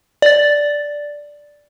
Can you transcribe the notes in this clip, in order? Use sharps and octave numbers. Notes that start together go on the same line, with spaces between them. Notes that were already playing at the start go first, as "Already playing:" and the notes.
D5 A6